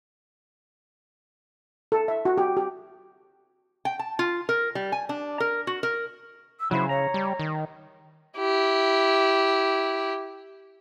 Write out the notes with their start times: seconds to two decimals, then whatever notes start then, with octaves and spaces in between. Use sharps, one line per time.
1.92 A4
2.08 E5
2.25 F#4
2.38 G4
2.57 G4
3.85 G5
3.99 A5
4.19 F4
4.49 A#4
4.75 G3
4.92 G#5
5.09 D4
5.40 A#4
5.67 F#4
5.83 A#4
6.59 E6
6.71 C#3 F#3 E4 C5 B5
6.89 C#5 A#5
7.14 G3
7.39 D#3
8.38 E4 G4